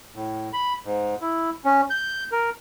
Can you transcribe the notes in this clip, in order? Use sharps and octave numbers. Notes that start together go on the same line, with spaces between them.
A2
B5
G#2
E4
C#4
G6
A#4